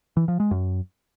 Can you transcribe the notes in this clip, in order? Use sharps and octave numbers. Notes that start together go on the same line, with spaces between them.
E3
F3
G#3
F#2